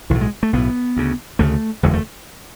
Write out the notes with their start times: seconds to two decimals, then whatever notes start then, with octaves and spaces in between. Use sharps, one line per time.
0.10 B1 A2 E3
0.21 G#3
0.43 A3
0.53 B1 A2 B3
0.96 D2 C#3
1.39 D2 C#3 A3
1.83 F#1 E2 D3 G#3
1.94 A3